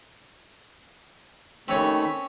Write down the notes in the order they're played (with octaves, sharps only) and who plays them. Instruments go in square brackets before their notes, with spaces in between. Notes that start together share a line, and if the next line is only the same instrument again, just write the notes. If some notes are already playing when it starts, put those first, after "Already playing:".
[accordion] D#2 A3 B5 [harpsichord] C4 C#4 C#5